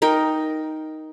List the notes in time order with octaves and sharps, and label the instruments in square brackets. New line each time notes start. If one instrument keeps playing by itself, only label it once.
[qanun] D#4 A#4 G5